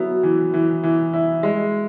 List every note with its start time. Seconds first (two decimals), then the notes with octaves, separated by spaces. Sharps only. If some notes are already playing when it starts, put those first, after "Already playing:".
Already playing: F#3 B3 E4
0.23 E3
0.54 E3
0.83 E3
1.13 E4
1.43 G#3